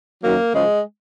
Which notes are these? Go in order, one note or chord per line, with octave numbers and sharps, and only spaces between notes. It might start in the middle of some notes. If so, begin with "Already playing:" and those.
F#2 D#3 F#3 A#3
F#2 C#3 F3 G#3